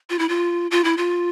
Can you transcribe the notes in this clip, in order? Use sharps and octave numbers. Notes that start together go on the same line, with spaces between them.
F4
E4
F4
F4
E4
F4